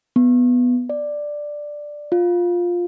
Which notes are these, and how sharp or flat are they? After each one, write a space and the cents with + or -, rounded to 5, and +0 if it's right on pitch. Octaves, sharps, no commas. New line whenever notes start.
B3 +0
D5 +5
F4 +10